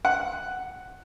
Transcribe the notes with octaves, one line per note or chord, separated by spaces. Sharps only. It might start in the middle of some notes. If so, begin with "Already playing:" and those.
F#5